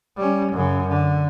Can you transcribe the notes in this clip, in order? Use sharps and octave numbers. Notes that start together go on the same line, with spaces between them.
G3 C#4
F#2 C#3
D3